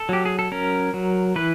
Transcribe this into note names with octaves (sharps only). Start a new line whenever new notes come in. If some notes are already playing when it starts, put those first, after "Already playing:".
Already playing: A4
F#3 G4
G#4
A4
C#4 A#4
F#3
E3 B4